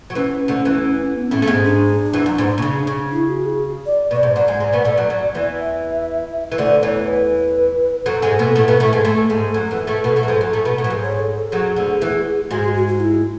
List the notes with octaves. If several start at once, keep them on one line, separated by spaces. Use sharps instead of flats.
F#3
E2 E3 C#4
D2 D3
E2 E3
B3
A2 A3 C#4
A3 B3
G#2 G#3 C#4
D4
E2 E3
F#2
G#2
B2
C#3
C#3
E4
F#4
G#4
D5
B2 D5
G#2
F#2 F#3 D5
G#2 G#3
G#2 G#3
B2 B3
A2 A3
F#2 F#3
F#2 F#3
E2 E3
E5
E3
D2 D3 D5
E2 E3 C#5
B4
F#2 F#3 A4
G#2 G#3
B2 B3
A2 A3
B2 B3
A2 A3
G#2 G#3
A2 A3 A4
G#2 G#3
F#2 F#3
E2 E3
A2 A3
B2 B3
A2 A3
F#3
G#2 G#3
F#2 F#3
A2 A3
B2 B3
A2 A3
F#3
G#2 G#3
C#5
A4
A4
F#2 F#3 G#4
D2 D3
E2 E3
G#2 G#3 F#4
F#4
F#4
F#4
E4